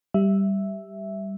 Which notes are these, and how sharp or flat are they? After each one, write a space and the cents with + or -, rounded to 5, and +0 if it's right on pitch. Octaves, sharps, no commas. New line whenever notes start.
G3 +0 E5 +0